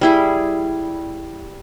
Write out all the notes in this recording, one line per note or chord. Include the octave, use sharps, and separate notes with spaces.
G3 E4 G#4